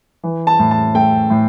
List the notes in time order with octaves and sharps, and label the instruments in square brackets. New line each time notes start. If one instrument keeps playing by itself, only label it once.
[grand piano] E3
A5
A2
A5
A3 G5
A2